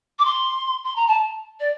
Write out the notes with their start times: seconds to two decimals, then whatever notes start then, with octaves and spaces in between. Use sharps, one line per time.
0.19 D6
0.25 C6
0.84 C6
0.96 A#5
1.07 A5
1.60 D5